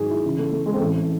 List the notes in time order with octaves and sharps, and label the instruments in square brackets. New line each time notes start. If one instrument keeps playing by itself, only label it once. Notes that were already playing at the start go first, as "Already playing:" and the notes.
Already playing: [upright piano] G#1 G#2 F#3 G#4
E4
C#2 C#3 E3
A3
A3
G#3
C4
A1 A2 E3 A3